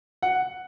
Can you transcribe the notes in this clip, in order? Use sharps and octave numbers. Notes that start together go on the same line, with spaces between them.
F#5